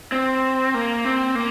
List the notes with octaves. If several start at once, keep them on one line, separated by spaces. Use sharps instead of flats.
C4
A#3
C4
A#3